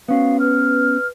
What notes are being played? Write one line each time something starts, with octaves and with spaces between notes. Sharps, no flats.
B3 C#4 F#4 F5
B4 F6